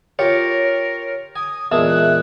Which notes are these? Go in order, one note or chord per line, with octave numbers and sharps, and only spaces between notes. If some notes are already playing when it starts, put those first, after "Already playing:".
F4 G4 A#4 C#5
G#5 D#6
E2 A#2 G#3 E5 A5
F#6